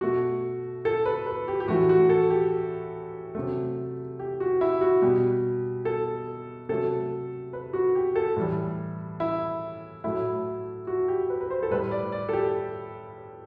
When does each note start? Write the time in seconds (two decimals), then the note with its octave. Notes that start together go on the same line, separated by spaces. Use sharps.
0.01 B2 A3 F#4
0.85 A4
1.06 B4
1.26 B4
1.48 G4
1.60 G4
1.68 A2 E3 A3 F#4
1.89 F#4
2.09 A4
2.30 G4
3.35 C3 F#3 A3
4.19 G4
4.40 F#4
4.61 E4
4.81 F#4
5.02 B2 G3 G4
5.85 A4
6.69 C3 F#3 A3 A4
7.53 B4
7.73 F#4
7.95 G4
8.16 A4
8.36 A2 E3 G3
9.20 E4
10.04 A2 F#3 A3 E4
10.87 F#4
11.08 G4
11.30 B4
11.41 B4
11.51 C5
11.63 A4
11.71 A2 G3 B4
11.91 D5
12.12 D5
12.29 A4
12.33 G4